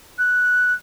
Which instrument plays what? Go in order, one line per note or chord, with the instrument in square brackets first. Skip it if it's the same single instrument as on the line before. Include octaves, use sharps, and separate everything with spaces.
[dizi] F#6